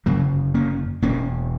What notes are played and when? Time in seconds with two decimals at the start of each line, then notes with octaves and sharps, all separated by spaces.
0.06 G1 F#2 C#3 F#3 A#3
0.54 A#3 C#4
1.02 E1 E2 B2 A#3 C#4